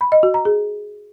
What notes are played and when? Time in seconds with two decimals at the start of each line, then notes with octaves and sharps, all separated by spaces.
0.01 B5
0.12 D#5
0.23 F#4
0.34 A#5
0.45 G#4